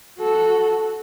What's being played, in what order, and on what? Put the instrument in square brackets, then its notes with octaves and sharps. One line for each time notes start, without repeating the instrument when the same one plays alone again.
[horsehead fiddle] F#4 A4